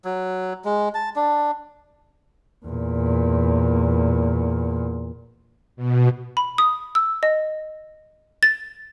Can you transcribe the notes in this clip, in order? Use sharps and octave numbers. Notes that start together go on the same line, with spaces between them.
F#3
G#3
A5
D4
E2 A#2
B2
B5
D#6
E6
D#5
A6